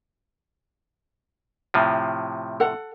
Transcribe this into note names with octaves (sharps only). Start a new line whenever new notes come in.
A2 C3 F3
A4 F#5